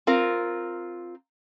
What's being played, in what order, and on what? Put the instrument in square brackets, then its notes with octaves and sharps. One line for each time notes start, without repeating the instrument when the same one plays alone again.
[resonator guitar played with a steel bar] C4 F4 A#4